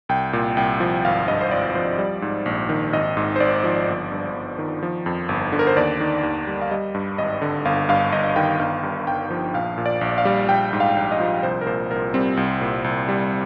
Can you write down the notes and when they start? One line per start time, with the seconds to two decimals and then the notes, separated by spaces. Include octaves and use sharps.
0.09 C2 G5
0.33 A#2
0.57 C2 G5
0.80 F3
1.05 G#1 F5
1.28 G2 D#5
1.41 C5
1.51 G#1 D5
1.75 F3 C5
1.98 G3 D5
2.22 G#2
2.46 A#1
2.69 D#3
2.93 G#1 D#5
3.17 G#2
3.36 C5
3.40 G#1 D5
3.64 F3
3.88 G1
4.12 G2
4.34 G1
4.58 D#3
4.83 F3
5.06 F2
5.29 G1
5.52 D3
5.59 A#4
5.67 C5
5.77 D#2 D5
6.01 D#3
6.23 D#2
6.47 G3
6.61 F5
6.71 G3 D#5
6.94 G2
7.18 G#1 D#5
7.42 D3
7.65 G1 F5
7.89 G2 F5
8.12 G1 D#5
8.36 D#3 G5
8.59 G1 F5
8.83 G2
9.07 G1 G5
9.30 F3
9.54 A#1 F5
9.78 A#2
9.86 D5
10.01 A#1
10.18 F5
10.25 G3
10.49 A#1 G5
10.73 G#2
10.80 F5
10.97 A#1
11.12 D#5
11.20 F3
11.43 C2 C5
11.61 A#4
11.66 A#2 C5
11.91 C2 A#4
12.14 G3 C4
12.37 C2
12.61 A#2
12.84 C2
13.09 G3